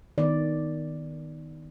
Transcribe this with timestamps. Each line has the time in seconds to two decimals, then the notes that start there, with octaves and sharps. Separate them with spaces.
0.18 D#3 B3 D5